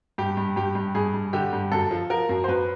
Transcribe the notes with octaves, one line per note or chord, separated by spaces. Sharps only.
G2 G4
G2
G2 G4
G2
G2 G#4
G2
D3 G4
G2
F#2 A4
F3
F3 A#4
F#2
C5
F#2 B4